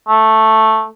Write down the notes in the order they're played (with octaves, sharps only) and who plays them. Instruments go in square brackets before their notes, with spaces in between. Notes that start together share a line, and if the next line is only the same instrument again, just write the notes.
[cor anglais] A3